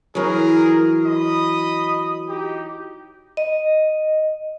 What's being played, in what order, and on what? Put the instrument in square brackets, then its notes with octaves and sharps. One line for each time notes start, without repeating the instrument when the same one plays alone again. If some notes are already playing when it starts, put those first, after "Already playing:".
[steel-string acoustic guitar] E3 F#3 [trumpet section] G#4 A#4
[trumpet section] D#5 B5 D#6
D#4 G4
[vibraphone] D#5